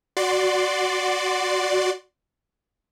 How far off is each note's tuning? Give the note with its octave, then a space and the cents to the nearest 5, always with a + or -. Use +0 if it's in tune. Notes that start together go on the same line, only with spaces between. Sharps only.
F#4 +0 D5 +0 C6 +0